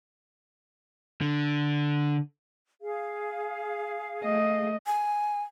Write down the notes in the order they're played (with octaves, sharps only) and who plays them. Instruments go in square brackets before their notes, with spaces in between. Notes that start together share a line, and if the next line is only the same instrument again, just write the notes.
[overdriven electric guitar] D3
[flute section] G#4 F5
[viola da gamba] A3 [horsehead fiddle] D#5
[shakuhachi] G#5